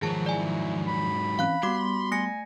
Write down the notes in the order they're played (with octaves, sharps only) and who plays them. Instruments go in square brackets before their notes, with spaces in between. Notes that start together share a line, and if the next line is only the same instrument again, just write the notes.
[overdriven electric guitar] G#2 F#3 [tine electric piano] D#3 F3 [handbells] G#4 A5
[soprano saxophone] E4 [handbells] D5 G#5
[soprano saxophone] B5
[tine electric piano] E3 C4 C#4 [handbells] F5 F#6
[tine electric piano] G3 B3 [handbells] F#4 D6 [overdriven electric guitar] C6
[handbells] A3 A#6 C#7 [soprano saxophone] G#5